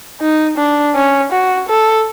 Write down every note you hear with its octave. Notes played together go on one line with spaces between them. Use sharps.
D#4
D4
C#4
F#4
A4